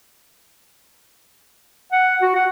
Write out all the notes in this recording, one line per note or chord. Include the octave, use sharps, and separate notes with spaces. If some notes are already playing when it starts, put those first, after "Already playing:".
F#5
F#4
F#5